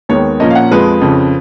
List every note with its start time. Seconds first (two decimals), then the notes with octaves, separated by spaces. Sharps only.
0.09 D#2 D#3 G#3 B3 C#5
0.40 A#2 F3 A#3 C#4 D#5
0.50 F5
0.55 F#5
0.71 F2 F3 G#3 B4
1.01 F2 C#3 F3